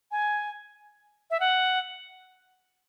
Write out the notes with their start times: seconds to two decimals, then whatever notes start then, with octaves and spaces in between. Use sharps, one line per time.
0.11 G#5
1.31 E5
1.40 F#5